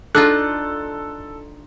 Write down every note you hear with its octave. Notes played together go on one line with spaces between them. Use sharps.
D4 D#4 F4 A4 F#6